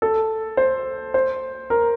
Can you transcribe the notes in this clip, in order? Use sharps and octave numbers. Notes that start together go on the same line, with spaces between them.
A4
C5
C5
A#4